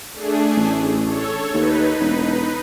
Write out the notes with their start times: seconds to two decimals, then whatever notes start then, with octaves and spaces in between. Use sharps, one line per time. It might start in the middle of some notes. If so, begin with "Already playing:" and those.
0.13 A3 D4 G#4
0.57 A1
1.03 A4 C#5
1.54 D#2 D#4 B4
2.00 E1